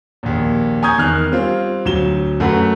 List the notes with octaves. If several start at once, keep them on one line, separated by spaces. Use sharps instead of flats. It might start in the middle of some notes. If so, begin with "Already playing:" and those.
A#1 D#2
G#5 A#5 C#6 D#6 G6 G#6
E2 D#3 F6 F#6
G3 C4 F4
D2 F#3 E7 G7
F#2 A3 F#4 B4 F#5